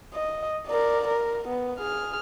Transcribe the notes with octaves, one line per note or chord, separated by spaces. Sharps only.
D#5
A#4 D5
A#4
B3
G#4 F6